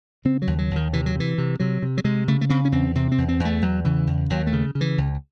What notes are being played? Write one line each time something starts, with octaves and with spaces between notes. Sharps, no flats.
C#3 C4
F#3
D#2
F#3
D#2
D#3
C3 E3
F#3
C3 E3
C3
C3 F#3
C3
F#3
C3 G#3
C#3 A3
A3
C#3 C4
C#4
E2 C4
C3 C4
C4
E2
C4
E2
A3
E2 F#3
C#3 E3
E2
D#2 F#3
A3
C#3
C#3
E3
C#2